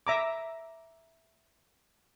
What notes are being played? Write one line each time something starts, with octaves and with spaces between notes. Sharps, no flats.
E5 A#5 D6